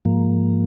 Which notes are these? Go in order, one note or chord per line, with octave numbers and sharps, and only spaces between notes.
G#2 F3 A#3